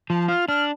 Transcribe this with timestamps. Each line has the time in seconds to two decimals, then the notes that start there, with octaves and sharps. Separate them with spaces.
0.10 F3 A5
0.28 F4 F6
0.48 D4 F6